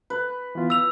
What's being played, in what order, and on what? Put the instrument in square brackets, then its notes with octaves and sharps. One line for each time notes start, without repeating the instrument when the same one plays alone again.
[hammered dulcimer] B4
[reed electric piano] E3 B3 F4
[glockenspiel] E6 F7